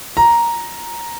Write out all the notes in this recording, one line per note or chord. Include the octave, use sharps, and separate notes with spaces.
A#5